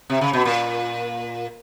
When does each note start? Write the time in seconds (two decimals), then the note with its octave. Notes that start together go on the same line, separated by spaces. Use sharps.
0.10 C3
0.21 C#3
0.33 B2
0.45 A#2